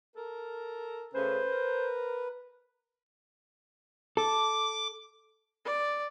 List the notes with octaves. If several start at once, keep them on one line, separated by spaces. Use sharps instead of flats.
A4 A#4
C#3 A3 C#4 B4 C5
A#4
A4 D6
D5